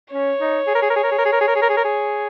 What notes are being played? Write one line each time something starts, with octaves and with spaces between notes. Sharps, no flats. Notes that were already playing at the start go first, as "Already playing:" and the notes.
C#4 C#5
D#4
G#4
A#4
G#4
A#4
G#4
A#4
G#4
A#4
G#4
A#4
G#4
A#4
G#4
A#4
G#4
A#4
G#4